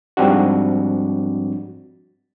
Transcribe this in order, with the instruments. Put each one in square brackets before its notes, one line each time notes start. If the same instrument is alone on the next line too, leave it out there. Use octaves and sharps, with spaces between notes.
[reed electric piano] G#2 F3 G3 C4 D4 F#4